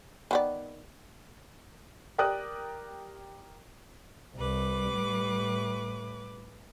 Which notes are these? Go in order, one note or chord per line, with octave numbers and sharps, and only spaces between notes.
D#3 B3 D5
G4 A#4 D5 G5 D#6 F#6
C2 G3 B4 D6
A2